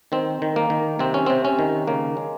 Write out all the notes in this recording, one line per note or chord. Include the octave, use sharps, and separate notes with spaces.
D#3 C4
D#3
A#3
D#3
C3 C4
C#4
C3 C4
C#4
D#3
C#3 A#3
G#3